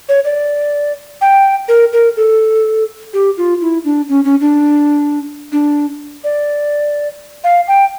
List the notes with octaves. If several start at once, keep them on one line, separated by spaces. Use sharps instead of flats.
C#5
D5
G5
A#4
A#4
A4
G4
F4
E4
D4
C#4
C#4
D4
D4
D5
F5
G5